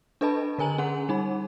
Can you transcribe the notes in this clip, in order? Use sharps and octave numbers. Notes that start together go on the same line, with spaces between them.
D4 A4 B4 D#5 A5 B5
D3 A#4 G#5 A#5 F#7
C#4 G#4 F#5
G3 D#4 B5